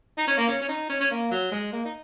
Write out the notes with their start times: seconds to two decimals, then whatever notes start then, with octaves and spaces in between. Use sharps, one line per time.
0.18 D#4
0.27 C#4
0.37 A#3
0.48 C#4
0.61 C#4
0.68 D#4
0.89 C#4
1.00 C#4
1.11 A#3
1.31 F#3
1.52 G#3
1.72 A#3
1.85 D#4